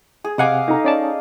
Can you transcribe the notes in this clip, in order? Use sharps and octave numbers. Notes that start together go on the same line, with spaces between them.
G#4
C3 D#5 F5 F#5 G#5 D6
D#4 A4 A#5
C#4 D5 A5